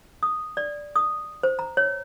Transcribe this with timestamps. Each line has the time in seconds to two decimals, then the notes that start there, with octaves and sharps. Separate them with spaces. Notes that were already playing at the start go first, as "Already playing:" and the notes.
0.23 D#6
0.57 D5
0.96 D#6
1.43 C5
1.59 A#5
1.77 C#5